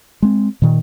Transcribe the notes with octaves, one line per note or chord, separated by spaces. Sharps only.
G#3 C4
A#2 D#3